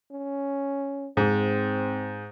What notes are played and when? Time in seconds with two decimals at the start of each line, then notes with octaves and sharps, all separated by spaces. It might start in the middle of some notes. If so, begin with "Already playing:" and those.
0.11 C#4
1.17 G#2 C4